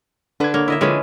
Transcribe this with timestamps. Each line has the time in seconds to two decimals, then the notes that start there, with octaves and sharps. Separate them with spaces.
0.40 D3 D4 B4 G#6
0.54 A#3 C#5
0.68 E4 D#5 E5
0.81 D3 F3 G#3 C4 C#4 F4 B4